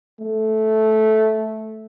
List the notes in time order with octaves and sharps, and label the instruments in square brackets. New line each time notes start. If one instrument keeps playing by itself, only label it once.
[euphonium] A3